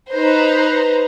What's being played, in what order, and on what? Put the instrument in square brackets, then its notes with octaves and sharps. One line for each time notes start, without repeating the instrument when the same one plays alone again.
[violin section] D#4 B4 C5 A#5